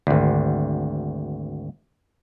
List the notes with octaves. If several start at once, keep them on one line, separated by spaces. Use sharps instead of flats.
G#1 D2